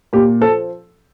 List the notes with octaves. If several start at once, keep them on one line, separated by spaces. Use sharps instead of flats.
A#2 G4
F3 A4